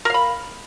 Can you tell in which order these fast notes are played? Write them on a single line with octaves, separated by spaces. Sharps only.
A#4 F5 B5